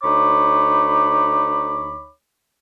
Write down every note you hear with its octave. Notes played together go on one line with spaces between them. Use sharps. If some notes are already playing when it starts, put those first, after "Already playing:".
D2 D#4 C#5 B5 D6